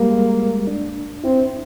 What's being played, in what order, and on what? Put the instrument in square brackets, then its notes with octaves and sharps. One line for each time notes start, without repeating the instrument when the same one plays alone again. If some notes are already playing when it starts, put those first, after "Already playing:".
Already playing: [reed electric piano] G3 G#3 [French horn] A#3
[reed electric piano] G#3
D4
[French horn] C4 [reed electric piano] E4